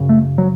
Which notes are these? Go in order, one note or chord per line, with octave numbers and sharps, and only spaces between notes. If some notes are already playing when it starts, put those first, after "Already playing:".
Already playing: F#2 C#3
A3
F#3